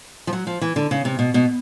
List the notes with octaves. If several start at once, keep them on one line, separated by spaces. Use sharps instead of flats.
F3
F#3
F3
E3
D3
C#3
C3
B2
B2